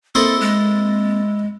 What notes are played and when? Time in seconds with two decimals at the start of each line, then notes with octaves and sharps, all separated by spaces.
0.15 A#3 C4 E4 A4 C5 D#5 A6
0.41 G#3